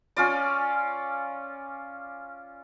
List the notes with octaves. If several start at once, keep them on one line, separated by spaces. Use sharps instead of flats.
C#4 F4 D5